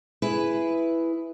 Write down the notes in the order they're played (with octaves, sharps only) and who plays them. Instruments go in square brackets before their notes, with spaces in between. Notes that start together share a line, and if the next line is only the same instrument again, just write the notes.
[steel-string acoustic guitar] E4 G#4 B4